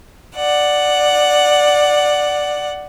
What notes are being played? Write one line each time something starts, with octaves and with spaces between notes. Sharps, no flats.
D5 F#5